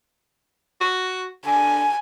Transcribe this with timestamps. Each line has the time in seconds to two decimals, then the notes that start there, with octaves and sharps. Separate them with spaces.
0.81 F#4
1.46 D3 G#5